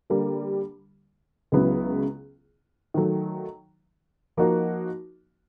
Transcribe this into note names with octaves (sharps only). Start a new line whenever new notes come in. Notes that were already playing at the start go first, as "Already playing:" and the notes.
D3 G3 A#3
C#2 C#3 F#3 B3 E4
D#3 F#3 A3
F3 A#3 D#4 F#4 A#4